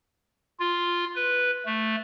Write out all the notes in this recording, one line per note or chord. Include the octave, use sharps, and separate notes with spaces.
F4
B4
A3